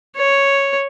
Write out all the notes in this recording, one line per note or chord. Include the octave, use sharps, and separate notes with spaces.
C#5